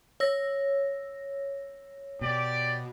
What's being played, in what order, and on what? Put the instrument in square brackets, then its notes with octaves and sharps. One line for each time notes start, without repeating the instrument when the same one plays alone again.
[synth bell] C#5 E6 A#6
[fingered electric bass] B2 [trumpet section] G4 D5